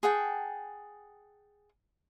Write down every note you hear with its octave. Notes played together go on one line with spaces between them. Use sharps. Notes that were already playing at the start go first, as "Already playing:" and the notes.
G#4 F#5 G5 A5